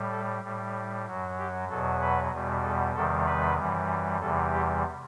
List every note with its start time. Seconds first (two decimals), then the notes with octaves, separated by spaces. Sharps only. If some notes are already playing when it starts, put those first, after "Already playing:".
Already playing: A2 G3
0.11 A4
0.43 A2 G3
1.06 F#2 F#3
1.38 G4
1.68 E2 B2 F#3 A4
2.01 B4
2.31 E2 B2 G3
2.63 A4
2.94 E2 C3 D#3 G3 A4
3.26 B4
3.57 F#2 E3 G3
4.21 E2 C3 E3 G3 A4
4.52 G4